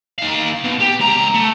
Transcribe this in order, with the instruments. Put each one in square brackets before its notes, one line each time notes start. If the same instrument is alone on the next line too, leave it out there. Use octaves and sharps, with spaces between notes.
[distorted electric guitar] D#3 F5
B2
G4
C#2 A#5
A3